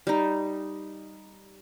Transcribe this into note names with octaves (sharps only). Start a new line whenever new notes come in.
G3 D#4